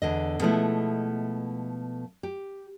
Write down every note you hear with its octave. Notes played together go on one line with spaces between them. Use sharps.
E2 D3 D#5
B2 F3 G#3 A3 B3 E4
G4